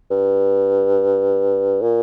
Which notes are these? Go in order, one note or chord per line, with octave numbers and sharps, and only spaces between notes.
G2
A#2